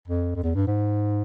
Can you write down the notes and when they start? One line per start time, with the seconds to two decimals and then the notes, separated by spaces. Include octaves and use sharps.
0.08 F2
0.36 F2
0.43 E2
0.55 G2
0.67 G#2